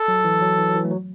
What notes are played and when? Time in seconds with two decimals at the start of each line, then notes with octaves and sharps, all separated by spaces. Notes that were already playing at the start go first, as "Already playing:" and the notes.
Already playing: A4
0.08 F#3
0.25 E3
0.41 F#3
0.58 E3
0.69 F#3
0.75 E3
0.85 A3
0.91 F#3